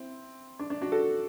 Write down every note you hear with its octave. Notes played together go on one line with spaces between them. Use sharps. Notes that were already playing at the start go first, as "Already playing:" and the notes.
Already playing: C4 E4
D4
D4
D4 F#4
F#4 A4